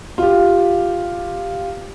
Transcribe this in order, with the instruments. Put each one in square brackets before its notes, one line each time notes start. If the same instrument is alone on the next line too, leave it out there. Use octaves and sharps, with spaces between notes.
[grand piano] F4 G4